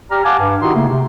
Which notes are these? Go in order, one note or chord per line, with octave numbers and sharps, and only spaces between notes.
G4 D5 A#5 F6
F5 F#5 G#5 A5 D6
G2
D#3 D#4 E4 F#4 G4 C6
C#3 A3 A#3
C3